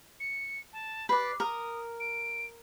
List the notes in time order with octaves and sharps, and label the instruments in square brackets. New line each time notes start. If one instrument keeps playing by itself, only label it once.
[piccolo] C#7
A5
[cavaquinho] B4 D5 [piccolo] C7
[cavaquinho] A#4 [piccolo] D#6
[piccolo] D7